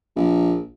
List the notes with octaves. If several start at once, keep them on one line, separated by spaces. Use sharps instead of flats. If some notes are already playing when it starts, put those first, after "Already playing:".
A#1